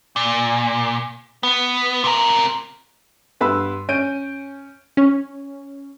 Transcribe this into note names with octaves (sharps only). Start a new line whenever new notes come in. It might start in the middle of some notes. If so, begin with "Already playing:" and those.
A#2
B3
C3 A#4
G2 B3 B4 B5 C6 E6
C#4 C#5 G6 D7 D#7
C#4